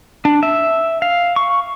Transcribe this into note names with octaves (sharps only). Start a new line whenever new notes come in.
D4
E5
F5
C#6